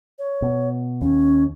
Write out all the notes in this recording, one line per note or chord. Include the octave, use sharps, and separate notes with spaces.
C#5
B2
D#2 C#4